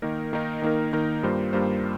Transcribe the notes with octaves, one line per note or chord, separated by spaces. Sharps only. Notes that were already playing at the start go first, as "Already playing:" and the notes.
D#3 A#3 D#4 A#4
D#3 A#3 D#4 A#4
D#3 A#3 D#4 A#4
D#3 A#3 D#4 A#4
G2 G3 A#3 F4 C5
G2 G3 A#3 F4 C5